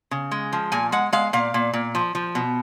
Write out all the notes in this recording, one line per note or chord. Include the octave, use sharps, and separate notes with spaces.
C#3
G#3
F3
A#2 G#5
G#3 F#5
G#3 F5
A#2 F5
A#2
A#2
F3
F3
B2